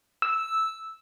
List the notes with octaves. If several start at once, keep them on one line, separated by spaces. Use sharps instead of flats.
E6